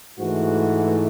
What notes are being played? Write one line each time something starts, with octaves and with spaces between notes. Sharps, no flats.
G#2 E3 A3 F#4